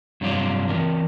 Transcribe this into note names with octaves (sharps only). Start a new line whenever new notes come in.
G2 C3 F#3 F4 D5
E3 C4 A#4